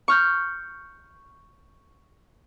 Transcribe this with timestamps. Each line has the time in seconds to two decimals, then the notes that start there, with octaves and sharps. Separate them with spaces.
0.08 C#6 F6 G6